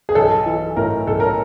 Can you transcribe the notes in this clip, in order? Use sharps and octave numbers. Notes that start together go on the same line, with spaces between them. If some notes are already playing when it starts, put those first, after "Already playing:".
G#4
B1 A4
E3
A2 A#4
B1 A4
A#4